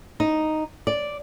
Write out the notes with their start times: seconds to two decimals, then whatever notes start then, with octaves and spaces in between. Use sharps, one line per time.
0.20 D#4
0.87 D5